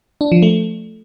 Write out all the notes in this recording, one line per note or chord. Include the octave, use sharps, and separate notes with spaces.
D4
F3
A3